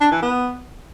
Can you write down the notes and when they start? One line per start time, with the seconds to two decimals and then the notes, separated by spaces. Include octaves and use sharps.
0.01 D4
0.12 E3
0.22 B3